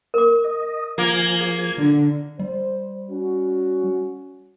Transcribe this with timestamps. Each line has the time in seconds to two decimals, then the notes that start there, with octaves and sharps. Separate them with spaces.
0.14 A#4 D6
0.44 D#5
0.98 F3 A#3 G#5 G#6
1.41 G#4
1.79 D3
2.39 G3 C5
3.11 C#4 F#4